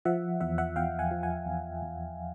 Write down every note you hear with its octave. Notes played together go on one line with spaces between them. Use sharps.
F3 E5 F#5
E2 E5 F#5
E5 F#5
E2 F5 G5
F#5 G#5
F3
F#5 G#5
E2
E2